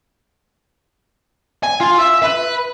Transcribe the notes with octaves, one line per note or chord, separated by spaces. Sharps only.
G#5
F4
E5
B4